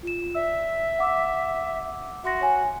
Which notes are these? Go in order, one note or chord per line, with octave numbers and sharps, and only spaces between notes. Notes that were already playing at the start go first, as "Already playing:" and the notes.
F4 E7
D5 E5 E6
F#5 D6 E6
F#4 E5 C6 A#6
C#5 G#5